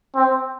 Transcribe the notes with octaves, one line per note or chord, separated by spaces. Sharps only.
C4